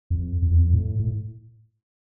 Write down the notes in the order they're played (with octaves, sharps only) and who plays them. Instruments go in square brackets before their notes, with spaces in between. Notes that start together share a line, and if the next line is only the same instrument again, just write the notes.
[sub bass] F2
F2
E2
F2
A2
A2